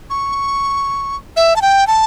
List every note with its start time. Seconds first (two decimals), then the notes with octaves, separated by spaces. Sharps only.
0.10 C#6
1.36 E5
1.56 A5
1.62 G5
1.87 A5